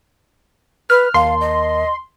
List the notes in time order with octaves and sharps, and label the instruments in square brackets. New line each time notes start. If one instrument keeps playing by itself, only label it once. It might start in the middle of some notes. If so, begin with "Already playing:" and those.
[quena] B4 [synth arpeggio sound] F6 [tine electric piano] F#6
[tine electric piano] D#2 A#4 A5 [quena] F5 [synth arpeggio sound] C6
[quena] D#5